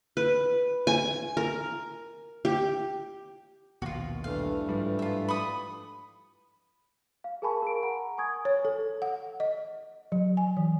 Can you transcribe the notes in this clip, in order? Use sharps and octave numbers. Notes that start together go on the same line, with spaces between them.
B4
G#5
A#4
G4
A#1 D#2 B2 F4 F#4
G2 E3 A3 F5
G#2 F3 G3
F4 E5
B5 C#6 D#6
F5
G#4 A#4 G#5 A5 B5 C#6
A#4 D7
F#5 A#5 B5
G#5 C#6 D#6 G#6
C#5
A4
F#5
D#5
F#3
G#5
E3